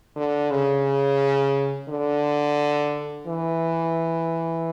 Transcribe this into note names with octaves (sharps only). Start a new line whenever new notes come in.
D3
C#3
D3
E3